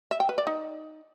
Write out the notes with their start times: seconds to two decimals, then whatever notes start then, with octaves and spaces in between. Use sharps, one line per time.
0.11 E5
0.20 G5
0.29 B4
0.38 D5
0.47 D#4